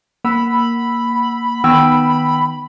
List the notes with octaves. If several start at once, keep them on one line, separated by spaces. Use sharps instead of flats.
A#3 F#5 B5 E6
D#3 B3 G5 E6